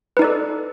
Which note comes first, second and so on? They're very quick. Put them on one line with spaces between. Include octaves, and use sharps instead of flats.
B4 D#4 D5 A4